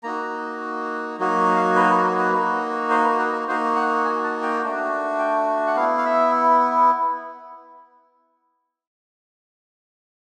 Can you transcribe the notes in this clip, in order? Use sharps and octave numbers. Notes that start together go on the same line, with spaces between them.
A#3 D#4 F#4 A#5
F#3 A#3 D#4 F#4
F5
B4
B4
A#4
B4
A#3 D#4 F#4
C5
B4
A#4
A#4
A#3 D#4 F#4 C5
F#5
G#5
A5
G5
A3 D4 F#4
G5
F#5
B3 E4 F5
F5
E5